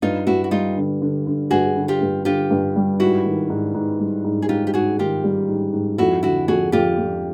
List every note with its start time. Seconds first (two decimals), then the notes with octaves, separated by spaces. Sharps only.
0.02 G2 D#4 F4
0.27 G2 E4 F#4
0.44 F#4
0.51 G3 D#4 F4
0.77 D3
1.02 D3
1.27 D3
1.51 G2 F#4 G#4
1.76 D3
1.88 F4 G4
2.01 G2
2.25 D3 F4 G4
2.50 G2
2.76 G3
3.00 G#2 E4 F#4
3.25 D#3
3.50 G#2
3.74 G#2
4.00 G3
4.25 G#2
4.42 G#4
4.49 G#2 F4 G4
4.67 G4
4.74 G#2 F#4 G#4
4.99 D#3 F4 G4
5.24 G3
5.48 G#2
5.73 G#2
5.98 F2 E4 F#4
6.23 D3 E4 F#4
6.48 F2 F#4 G#4
6.72 F2 F4 G4
6.98 F2